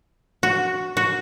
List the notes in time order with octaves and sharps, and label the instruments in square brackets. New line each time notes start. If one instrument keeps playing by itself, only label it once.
[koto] F#4
F#4